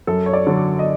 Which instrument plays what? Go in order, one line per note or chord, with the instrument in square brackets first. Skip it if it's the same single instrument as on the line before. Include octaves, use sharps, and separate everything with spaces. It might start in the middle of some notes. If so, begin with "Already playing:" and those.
[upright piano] F#2 A4
C#5
D5
D3 F#3
D#5